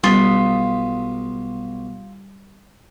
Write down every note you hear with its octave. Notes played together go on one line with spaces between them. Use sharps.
B1 G3 F4 D#6 B6